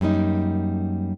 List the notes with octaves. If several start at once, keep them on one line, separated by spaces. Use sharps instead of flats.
F#2 G3 A#3 D#4